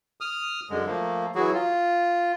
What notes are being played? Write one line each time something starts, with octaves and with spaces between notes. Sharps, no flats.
D#6 F6
F#2 D3 G#3
F3 A3 A#3
E3 F#3 E4 F#4 G#4
F4